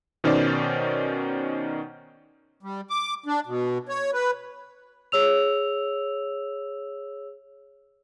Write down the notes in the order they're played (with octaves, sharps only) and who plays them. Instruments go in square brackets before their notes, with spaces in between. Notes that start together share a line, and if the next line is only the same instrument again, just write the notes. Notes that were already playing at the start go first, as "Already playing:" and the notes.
[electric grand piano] B2 D#3 C#4 D#4 C5 D5
[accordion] G3
D6
D4
B2
C#5
B4
[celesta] G#4 C#5 E6 F7